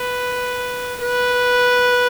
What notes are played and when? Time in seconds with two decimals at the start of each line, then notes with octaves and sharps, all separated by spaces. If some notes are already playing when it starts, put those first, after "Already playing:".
Already playing: B4
1.01 B4